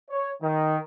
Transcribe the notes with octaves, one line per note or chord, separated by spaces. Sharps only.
C#5
D#3